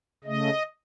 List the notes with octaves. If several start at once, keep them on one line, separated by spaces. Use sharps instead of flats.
C#3 A3 D#5